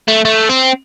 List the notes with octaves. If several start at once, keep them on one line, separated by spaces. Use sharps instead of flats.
A3
A3
C4